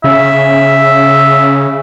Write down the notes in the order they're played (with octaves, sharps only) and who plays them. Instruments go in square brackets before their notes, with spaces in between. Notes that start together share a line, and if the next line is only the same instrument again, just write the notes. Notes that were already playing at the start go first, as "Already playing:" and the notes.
[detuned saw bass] C#3 [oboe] E5